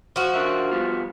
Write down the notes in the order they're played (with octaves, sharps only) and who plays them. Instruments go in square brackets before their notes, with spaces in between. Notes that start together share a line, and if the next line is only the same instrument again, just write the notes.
[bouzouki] F3 F#4
[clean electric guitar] D4 A#4 E5
G3 B3 F4